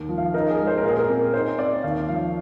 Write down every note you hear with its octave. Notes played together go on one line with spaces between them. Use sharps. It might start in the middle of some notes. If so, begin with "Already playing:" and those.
Already playing: D#2
F3
F5
D#4 A#4
G#4
G#3
C5
A#4
A#2
G#4
A#4
C4
D#4 C5
C4 D5
D#2 F5
F3 F5